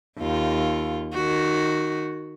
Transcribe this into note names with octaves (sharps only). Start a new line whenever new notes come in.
D#2 F4
D#3 F#4